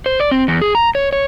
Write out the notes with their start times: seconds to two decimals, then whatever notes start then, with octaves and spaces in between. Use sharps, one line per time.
0.06 C5
0.20 D5
0.31 C4
0.48 E2
0.61 G#4
0.75 A#5
0.95 C#5
1.13 C#5